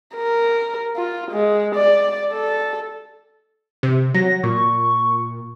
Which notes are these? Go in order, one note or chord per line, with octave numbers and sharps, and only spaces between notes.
A#4
F4
G#3
D5
A4
C3
F#3 A#6
A#2 C#6